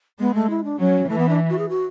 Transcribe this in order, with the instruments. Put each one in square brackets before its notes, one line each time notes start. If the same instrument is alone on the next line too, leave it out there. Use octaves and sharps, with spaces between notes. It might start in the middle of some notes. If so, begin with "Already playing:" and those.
[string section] G#3 [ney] B3
[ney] A3
E4
D4
[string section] F#3 [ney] C#4
[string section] E3 [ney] A3
[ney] B3
D4
F#4
G#4
F#4